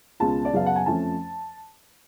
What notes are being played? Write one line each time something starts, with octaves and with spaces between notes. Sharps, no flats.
C#2 B2 G#3 C#4 F4 A5
D5
F#2 C#3 F#3 B3 F5
F#5
G#5
F2 F3 A3 C#4 A5